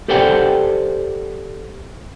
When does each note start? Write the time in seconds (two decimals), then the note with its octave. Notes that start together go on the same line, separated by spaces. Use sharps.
0.08 G4 A4 C5 D5 F#5 G5